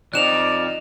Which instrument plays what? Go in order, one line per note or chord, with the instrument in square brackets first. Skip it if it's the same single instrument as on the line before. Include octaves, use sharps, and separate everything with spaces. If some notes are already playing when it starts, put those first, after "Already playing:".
[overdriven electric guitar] F3 C4 [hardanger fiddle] D#4 [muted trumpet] D5 [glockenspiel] F#6 E7 F7